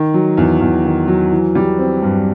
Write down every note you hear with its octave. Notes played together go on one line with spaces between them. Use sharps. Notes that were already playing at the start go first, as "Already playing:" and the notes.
Already playing: D#3
F#3
E2
E2
D#3
F#3
E3
G3
C4
G2